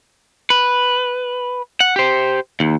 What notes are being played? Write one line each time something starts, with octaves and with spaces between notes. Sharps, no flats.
B4
F#5
G4 C5
D#2